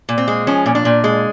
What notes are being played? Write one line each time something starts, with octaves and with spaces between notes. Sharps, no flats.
A#2
C4
G#3
F3 C#4
A#2
D4
A#2
G#3